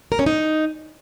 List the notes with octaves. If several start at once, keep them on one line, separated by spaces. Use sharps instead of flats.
A#4
C#4
D#4